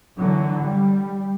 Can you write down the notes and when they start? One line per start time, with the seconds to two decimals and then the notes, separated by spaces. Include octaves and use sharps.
0.17 D3 E3 F#3
0.61 G3